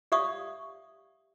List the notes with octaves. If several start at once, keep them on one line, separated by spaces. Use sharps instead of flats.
G4 D5 E5 F5 C#6 D#6